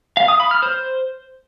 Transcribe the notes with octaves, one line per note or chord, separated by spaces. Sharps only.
F5
D#6
B5
F6
C5